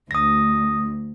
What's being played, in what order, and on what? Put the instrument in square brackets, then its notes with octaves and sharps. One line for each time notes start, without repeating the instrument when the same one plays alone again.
[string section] D2 [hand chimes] D#6 A#6